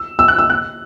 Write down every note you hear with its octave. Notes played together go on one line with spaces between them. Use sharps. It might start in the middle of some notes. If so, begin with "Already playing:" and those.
Already playing: E6
E6
F#6
E6
F#6